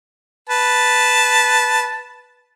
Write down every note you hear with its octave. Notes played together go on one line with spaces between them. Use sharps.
B4 A5